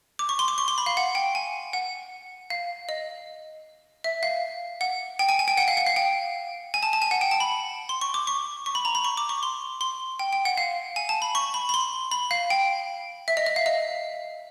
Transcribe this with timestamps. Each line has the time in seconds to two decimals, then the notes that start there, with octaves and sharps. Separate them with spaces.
0.19 D6
0.29 C#6
0.39 C6
0.48 D6
0.58 C#6
0.68 C6
0.78 B5
0.86 F5
0.97 F#5
1.15 G5
1.35 G#5
1.73 F#5
2.50 F5
2.89 D#5
4.04 E5
4.23 F5
4.81 F#5
5.19 G5
5.29 G#5
5.39 G#5
5.48 G5
5.57 F#5
5.68 F5
5.77 F#5
5.86 F5
5.96 G5
6.74 G#5
6.83 A5
6.93 A5
7.02 G#5
7.11 F#5
7.21 G5
7.31 A5
7.40 B5
7.89 C6
8.01 C#6
8.14 D6
8.27 C#6
8.66 C#6
8.75 B5
8.85 A#5
8.95 B5
9.04 C#6
9.17 D6
9.29 C#6
9.43 C6
9.81 C6
10.19 G5
10.33 G5
10.45 F#5
10.57 F5
10.96 G#5
11.09 A5
11.22 B5
11.35 C#6
11.54 B5
11.69 B5
11.74 C6
12.11 B5
12.31 F5
12.50 G5
13.28 E5
13.37 D#5
13.46 E5
13.56 F5
13.66 D#5